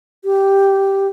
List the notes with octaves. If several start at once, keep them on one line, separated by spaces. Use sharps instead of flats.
G4